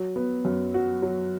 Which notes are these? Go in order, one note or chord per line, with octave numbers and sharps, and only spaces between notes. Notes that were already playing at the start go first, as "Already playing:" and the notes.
Already playing: F#3
B3
F#2
F#4
F#3